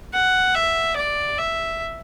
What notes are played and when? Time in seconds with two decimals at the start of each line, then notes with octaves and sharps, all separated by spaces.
0.14 F#5
0.55 E5
0.96 D5
1.38 E5